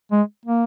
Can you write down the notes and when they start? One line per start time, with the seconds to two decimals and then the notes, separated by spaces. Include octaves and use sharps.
0.12 G#3
0.45 A#3